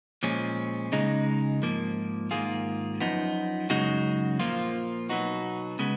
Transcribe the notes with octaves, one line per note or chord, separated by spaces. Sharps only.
A#2 F3 G#3 C#4
C#2 C#3 G#3 D#4
G#2 F3 A#3
G#2 D#3 A#3 F4 G#4
F#2 F3 B3 D#4
F#2 C#3 G#3 D#4 F#4
A#2 F3 A#3 F4
B2 F#3 B3 D#4 F#4
C#3 G#3 B3